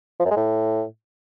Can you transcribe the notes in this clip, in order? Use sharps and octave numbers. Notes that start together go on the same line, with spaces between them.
F3
F#2
G#3
A2